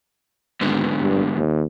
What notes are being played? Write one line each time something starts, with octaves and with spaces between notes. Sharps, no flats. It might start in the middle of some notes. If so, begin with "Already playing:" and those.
G#1 G#2 D3 B3
G2
D#2